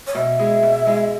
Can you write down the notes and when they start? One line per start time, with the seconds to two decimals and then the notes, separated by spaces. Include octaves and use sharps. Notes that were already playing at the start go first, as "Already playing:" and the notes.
0.07 C#5
0.15 B2 E5
0.39 G#3 E4 G#4
0.63 B2
0.86 G#3 E4 G#4